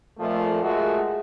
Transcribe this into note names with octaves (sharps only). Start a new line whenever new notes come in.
F2 A#2 F3 A3
G#3 A3 F4 F#4 G#4 A#4